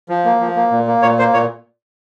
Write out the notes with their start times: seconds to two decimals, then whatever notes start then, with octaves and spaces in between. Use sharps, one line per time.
0.09 F3
0.25 A#3
0.40 F3
0.56 A#3
0.71 A#2
0.87 A#3
1.02 A#2 C#5
1.19 A#3 C5
1.33 A#2 C#5